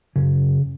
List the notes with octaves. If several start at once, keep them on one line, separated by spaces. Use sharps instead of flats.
F#2 C#3